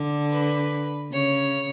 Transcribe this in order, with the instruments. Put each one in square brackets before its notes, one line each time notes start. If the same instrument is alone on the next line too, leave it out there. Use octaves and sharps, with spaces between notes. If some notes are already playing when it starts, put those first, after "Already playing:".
Already playing: [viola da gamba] D3
[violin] B4
[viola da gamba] C#3 [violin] C#5